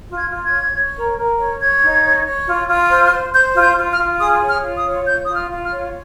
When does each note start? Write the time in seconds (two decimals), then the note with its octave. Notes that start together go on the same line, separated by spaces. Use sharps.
0.09 F4
0.16 G#6
0.30 F4
0.45 G#6
0.52 C#5
0.74 C#5
0.96 A#4
1.17 A#4
1.39 C#5
1.60 C#5 G#6
1.82 D#4
2.04 C#5
2.25 C#5
2.47 F4
2.69 F4
2.90 C5
3.12 C5
3.33 C5 G6
3.55 F4
3.62 G6
3.77 F4
3.91 F6
3.98 F4
4.19 G#4 D#6
4.41 C#5
4.49 F6
4.63 F4
4.77 D#6
4.85 C#5
5.06 F4 G6
5.26 F4 D#6
5.35 F6
5.50 F4
5.64 F6
5.71 C#5